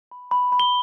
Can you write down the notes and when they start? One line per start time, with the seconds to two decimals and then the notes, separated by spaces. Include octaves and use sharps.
0.11 B5
0.31 B5
0.52 B5
0.60 G7